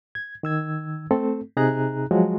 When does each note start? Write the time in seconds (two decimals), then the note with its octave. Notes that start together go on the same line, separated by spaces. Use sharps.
0.15 G#6
0.43 D#3 E6 G#6
1.11 A3 C4 A4
1.57 C3 D#4 G#4 A#5 F#6
2.11 F3 F#3 G#3 F#4